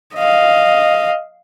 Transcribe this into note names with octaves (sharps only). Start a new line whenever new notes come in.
D#5 F5